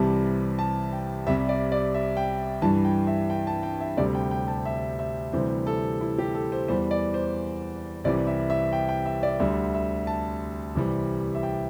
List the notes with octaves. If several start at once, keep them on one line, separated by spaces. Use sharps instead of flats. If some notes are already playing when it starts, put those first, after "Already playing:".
Already playing: C2 C3 E3 G3 A5
A5
G5
C2 C3 G3 E5
D5
D5
E5
G5
G2 E3 G3 A5
G5
E5
G5
A5
G5
E5
D2 C3 G3 D5
G5
G5
A5
E5
E5
D2 C3 E3 G3 C5
A4
E4
G4
A4
C5
E2 E3 G3 C5
D5
C5
C2 C3 E3 G3 D5
E5
E5
G5
G5
E5
D5
D2 D3 G3 E5
E5
A5
C2 C3 E3 G3
E5
G5